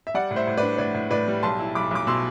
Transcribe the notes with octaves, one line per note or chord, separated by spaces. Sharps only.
E5
G3 D5 F#5
A2
C5 E5
A2
B4 D5
D4
A2 B4 D5
A2
A2 B4 D5
G3
B1 A5 C6
E4
B1 B5 D6
B1 D6
B2 C6 E6